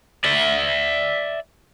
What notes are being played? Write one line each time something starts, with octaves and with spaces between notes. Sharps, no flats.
D5 E5